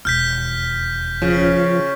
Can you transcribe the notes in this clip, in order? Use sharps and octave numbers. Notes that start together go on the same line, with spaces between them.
E1 D#2 F6 G6 B6
C#3 F3